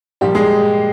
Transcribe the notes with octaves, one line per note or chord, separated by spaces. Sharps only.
A#2 F3 G3 G4
G#3 G#4